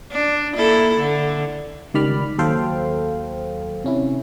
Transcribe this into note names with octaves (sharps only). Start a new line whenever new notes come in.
D4
A#3 E4 A4
D3
C#2 D#3 G3 D5 B5 F6
D#2 F#3 A4 C5 F5 G5
C3 C#4 E4